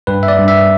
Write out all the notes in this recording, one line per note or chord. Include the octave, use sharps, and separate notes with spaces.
G2 B4
E5
D5
G2
E5